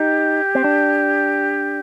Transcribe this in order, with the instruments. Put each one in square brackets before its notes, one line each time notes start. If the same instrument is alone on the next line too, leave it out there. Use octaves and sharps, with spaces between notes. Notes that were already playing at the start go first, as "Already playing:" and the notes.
Already playing: [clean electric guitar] D#4 [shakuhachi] G4
[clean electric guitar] C4
D4